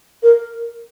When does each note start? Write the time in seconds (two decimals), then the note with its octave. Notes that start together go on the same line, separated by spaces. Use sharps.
0.23 A#4